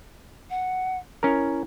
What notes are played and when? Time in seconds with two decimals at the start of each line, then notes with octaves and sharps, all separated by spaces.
0.50 F#5
1.23 C#4 E4 A#4